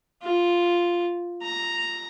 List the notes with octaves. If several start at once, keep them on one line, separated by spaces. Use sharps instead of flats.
F4
A#5